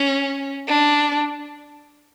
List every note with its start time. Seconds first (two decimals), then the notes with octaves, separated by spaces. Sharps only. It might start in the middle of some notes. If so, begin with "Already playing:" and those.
Already playing: C#4
0.68 D4